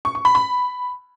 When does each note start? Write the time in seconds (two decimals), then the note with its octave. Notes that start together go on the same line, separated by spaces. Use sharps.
0.05 C#6
0.15 C#6
0.25 B5
0.35 B5